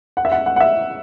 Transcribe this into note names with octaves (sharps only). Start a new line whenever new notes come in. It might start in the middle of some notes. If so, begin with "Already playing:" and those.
F#5
E5
F#5
F#5
F#5
E5